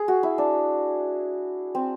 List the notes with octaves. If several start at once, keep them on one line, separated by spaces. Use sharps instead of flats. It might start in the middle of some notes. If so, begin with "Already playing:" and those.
Already playing: G#4
F#4
E4
D4
C4